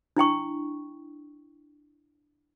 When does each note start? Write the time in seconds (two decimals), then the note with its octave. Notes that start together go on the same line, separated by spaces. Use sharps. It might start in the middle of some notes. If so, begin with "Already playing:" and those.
0.17 D4 E4 G5 C#6